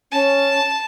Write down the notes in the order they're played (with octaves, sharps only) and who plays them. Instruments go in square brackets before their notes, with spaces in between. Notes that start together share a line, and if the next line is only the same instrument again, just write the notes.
[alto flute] C#4 [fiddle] A5